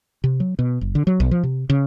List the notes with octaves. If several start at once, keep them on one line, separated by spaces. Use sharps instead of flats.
C3
F#3
B2
F#1
D3
F#3
B1
F3
C3
C#3